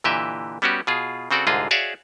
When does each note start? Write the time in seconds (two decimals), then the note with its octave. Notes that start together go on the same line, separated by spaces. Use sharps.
0.04 A#2 D3 E3 G4 D#5 E5
0.62 G3 B3 C#4 F#4 G4
0.87 B2 F4 G#4
1.31 C#3 C4 F#4 A4 D5
1.47 C2 G#2 D3 F4 G#4 D#5
1.71 F#4 G#4 C#5 D5 E5 F5